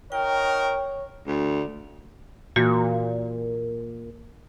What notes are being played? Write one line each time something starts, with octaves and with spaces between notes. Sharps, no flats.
D#4 F#4 A#4 C#5 G5
D2
A#2 E3 A#3 F#4